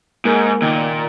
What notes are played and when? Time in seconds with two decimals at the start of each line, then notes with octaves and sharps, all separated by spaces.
0.25 G#2 A#3
0.62 A#2 D#3